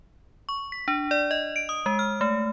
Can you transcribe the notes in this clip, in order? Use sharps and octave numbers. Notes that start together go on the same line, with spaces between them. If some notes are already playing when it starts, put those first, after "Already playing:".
C#6
B6
D4
D5
D#5
D7
D#6
G#3
F6
A3